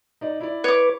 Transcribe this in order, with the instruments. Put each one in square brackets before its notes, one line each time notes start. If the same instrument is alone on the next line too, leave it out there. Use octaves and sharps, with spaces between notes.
[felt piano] D#4 D5 D#5
E4 D5
[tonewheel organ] B4 [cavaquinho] C#5 D6